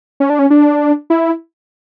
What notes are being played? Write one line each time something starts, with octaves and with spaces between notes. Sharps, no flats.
C#4
D4
C#4
D4
E4